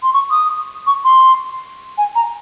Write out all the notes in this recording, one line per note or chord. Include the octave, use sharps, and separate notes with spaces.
C6
C#6
D#6
C#6
C6
G#5
A#5